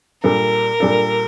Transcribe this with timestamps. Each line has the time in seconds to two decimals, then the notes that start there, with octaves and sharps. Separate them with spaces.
0.24 A#2 G3 D4 A4 A#4
0.80 A#2 G3 D4 A4